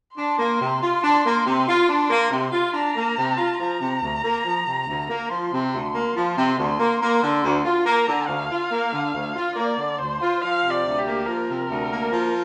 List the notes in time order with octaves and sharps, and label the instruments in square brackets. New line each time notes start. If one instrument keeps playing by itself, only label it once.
[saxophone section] D4 [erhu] C6
[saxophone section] A#3
C3
F4
D4
A#3
C3
F4
D4
A#3
C3
F4
[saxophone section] D4 [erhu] A#5
[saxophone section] A#3
C3
F4
[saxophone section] F3 [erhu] A#5
[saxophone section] C3
D2
A#3
F3
C3
D2
A#3
[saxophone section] F3 [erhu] C6
[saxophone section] C3
D2
A#3
F3
C3
D2
A#3
A#3
D3
D2
F4
[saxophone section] A#3 [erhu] A#5
[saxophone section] D3
[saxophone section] D2 [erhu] F5
[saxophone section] F4
A#3
D3
D2
F4
[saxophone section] A#3 [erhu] D5
[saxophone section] D3
[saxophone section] D2 [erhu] C5
[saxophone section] F4
[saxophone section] F3 [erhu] F5
[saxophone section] C3
[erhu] D5
[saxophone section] D2
[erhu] G4
[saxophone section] A#3
[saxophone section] F3 [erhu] A#4
[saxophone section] C3
D2
A#3
F3